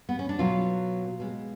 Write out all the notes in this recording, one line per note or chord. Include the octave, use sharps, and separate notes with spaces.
B3
C#4
D4
B2 F#3 F4
B2 G#3